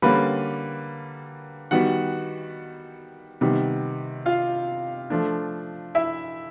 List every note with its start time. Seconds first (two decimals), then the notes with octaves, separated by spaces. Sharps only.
0.02 D3 G3 A#3 C#4 B4 B5
1.71 D#3 G3 B3 F#4 F#5
3.41 C3 D#3 G3 B3
4.26 F4 F5
5.10 F3 A3 D4
5.95 E4 E5